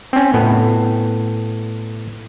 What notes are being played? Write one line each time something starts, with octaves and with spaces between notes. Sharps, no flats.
C4 C#4
A2 B3